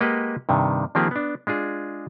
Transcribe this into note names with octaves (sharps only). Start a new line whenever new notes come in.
G#3 A#3 G4 B4 D#5 F#5
G2 C3 D#3
D#3 F3 A#3 C4 G4 G#4
B3 D4
G#3 D4 F4 G#4